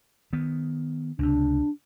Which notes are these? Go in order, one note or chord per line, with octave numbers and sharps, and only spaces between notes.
D#3 B3
C#2 C3 D4